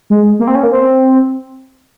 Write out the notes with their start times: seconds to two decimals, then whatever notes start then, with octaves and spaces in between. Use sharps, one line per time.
0.10 G#3
0.39 A#3
0.47 C4
0.55 C#4
0.63 A#3
0.72 C4